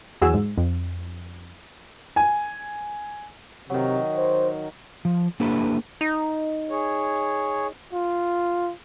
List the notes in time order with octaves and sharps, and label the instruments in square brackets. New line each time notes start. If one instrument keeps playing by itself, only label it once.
[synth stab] E2 E3 F#3 F#4 G#4 E6
G#2
F2
[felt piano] G#5
[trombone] C3 [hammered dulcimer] D#3 F#3
[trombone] C5
[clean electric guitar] F3
A#3 D4 E4 G4 A4 B4
[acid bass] D#4
[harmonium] G#4 C#5
[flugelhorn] F4